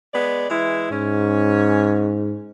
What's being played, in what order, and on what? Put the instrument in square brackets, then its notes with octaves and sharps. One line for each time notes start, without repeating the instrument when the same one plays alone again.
[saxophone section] G#3 B3 D5
E3 G#3 E4
[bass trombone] G#2 [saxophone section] C#4